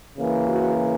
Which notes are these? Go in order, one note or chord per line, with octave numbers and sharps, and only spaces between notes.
C#3 E3 A#3
F#4